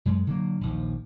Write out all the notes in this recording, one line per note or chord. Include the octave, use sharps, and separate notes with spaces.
F#2 G#3
D3 F#3 A#3
A#1 D#2 F3